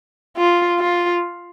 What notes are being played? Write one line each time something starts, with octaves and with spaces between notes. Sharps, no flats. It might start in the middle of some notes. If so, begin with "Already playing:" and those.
F4
F4